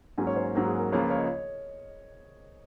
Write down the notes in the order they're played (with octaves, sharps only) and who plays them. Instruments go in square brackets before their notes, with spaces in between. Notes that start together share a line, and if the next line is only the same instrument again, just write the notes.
[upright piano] G#2 F#3 A#3 C#4 [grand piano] G#5
[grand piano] C#5
C5
C#5
[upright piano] G#2 F#3 A#3 C#4
[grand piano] G#4
A#4
[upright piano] C#2 C#3 F3 A#3 F4 [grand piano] C#5
[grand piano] C#5
D#5
C#5